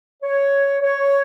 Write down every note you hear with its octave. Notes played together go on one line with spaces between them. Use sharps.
C#5
C#5